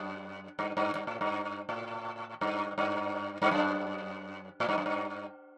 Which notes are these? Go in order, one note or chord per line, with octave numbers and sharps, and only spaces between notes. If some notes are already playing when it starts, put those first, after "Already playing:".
Already playing: F#2
G2
G2
G2
A2
G2
A2
G2
G2
G2
F#2
A2
G2
F#2
G2